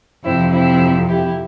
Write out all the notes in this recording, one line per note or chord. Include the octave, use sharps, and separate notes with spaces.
F2 C3 E3 C4 E4
C4 E4
E4 G4